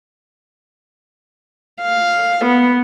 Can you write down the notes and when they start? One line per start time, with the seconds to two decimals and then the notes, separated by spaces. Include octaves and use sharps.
1.82 F5
2.45 B3